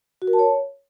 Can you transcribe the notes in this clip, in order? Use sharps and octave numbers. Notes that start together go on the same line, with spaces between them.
F#4
A#4
A5
C#5